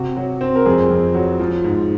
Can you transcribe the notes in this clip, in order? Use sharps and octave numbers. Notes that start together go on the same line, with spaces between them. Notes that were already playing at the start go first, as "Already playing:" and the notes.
Already playing: C3 F#4
F#3
C4
A#4
F2 G#4
F2
F#3
F3
G#2